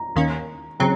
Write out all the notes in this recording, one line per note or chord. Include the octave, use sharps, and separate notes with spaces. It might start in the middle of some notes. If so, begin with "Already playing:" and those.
Already playing: A#5
D#2 D#3 A#3 C#4
C#3 F#3 C4 A#5